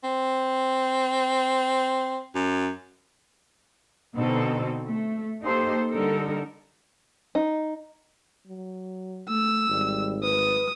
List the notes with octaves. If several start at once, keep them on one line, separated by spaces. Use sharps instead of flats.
C4
F#2
B2 D3 C4 D#4 A4
A3
A#3 D#4 G4 A4 C5
D3 G3 D#4 A4 A#4
D#4
F#3
A3 E6
G#1 G3
B4 D#6